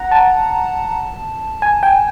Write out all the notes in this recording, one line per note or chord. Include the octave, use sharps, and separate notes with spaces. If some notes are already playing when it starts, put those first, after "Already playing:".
Already playing: F#5 A#5
A5
G#5
G5